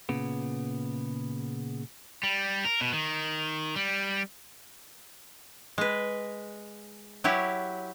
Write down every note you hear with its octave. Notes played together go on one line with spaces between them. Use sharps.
A#2 C#3 B3
G3
A#4
B2
D#3
G3
G#3 B4
F#3 E4 G4 C#5